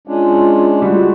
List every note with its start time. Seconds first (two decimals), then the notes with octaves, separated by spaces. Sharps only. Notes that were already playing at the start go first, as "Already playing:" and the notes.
0.07 G#3 C#4 D4 F4
0.82 G3 G#3 F4 F#4